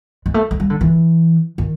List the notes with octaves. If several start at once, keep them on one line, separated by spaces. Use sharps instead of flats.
G#3
A3
G#3
G3
D3
E3
D#3